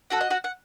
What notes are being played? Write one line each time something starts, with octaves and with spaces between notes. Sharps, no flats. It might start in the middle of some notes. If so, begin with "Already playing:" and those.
F#4 A4 F#5
D#5
F#4 F#5
F#5